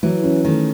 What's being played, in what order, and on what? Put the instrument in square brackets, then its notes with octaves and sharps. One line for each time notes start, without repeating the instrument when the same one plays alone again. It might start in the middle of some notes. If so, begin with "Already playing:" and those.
[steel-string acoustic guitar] E3 [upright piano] F#3
[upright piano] C#4
[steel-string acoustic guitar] D#3 [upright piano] A3